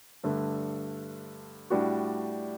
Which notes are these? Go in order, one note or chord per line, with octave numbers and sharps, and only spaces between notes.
G2 D3 A3
A2 G3 D4 F#4